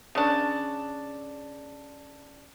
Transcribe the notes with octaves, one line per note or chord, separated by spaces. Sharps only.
C#3 D4